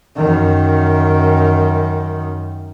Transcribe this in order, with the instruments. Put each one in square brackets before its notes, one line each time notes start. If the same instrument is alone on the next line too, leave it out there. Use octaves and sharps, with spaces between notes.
[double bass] F#2 D#3